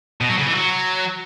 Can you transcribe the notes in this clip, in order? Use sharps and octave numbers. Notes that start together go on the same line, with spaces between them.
B2
F#3
C#3
E3
F#3